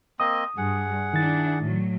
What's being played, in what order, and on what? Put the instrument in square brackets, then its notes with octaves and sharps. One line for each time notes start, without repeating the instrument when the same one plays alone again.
[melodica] A#3 C4 D#5 [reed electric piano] D#6
[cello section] G2 [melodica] G#4 F#5
[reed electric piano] D#3 A6 [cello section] D4 E4
[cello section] A2 F#3